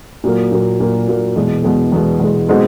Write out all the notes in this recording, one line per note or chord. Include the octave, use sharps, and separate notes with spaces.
A#2 F#3 A#3
A#2 F#3 A#3
A#2 F#3 A#3
A#2 F#3 A#3
E2 B2 G#3
E2 B2 G#3
E2 B2 G#3
E2 B2 G#3
B2 G#3 C4 D#4 F#4